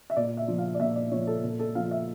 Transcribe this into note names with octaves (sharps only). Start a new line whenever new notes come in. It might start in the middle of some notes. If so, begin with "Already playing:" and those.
E5
A#2 D5
E5
F3
F5
D5
A#2 E5
D5
F3 C#5
A4
A#2
A4
F3 F5
E5